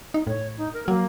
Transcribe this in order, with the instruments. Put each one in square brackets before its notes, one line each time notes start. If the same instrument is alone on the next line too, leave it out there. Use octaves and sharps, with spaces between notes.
[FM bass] D#4
[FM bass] A2 [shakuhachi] C#5
[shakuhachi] D#4
A#4
[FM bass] F#3 [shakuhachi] A#3